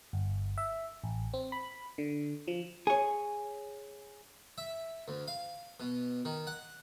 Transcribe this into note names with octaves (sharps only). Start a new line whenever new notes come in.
G1
E5
A1
C4
B5
D3
F3
G#4 C#5
E5
D2
F5
B2
D#3
F#5